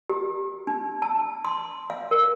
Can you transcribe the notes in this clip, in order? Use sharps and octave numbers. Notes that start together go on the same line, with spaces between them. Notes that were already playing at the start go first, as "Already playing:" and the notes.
G4
D4
A5
C6
F5
A#4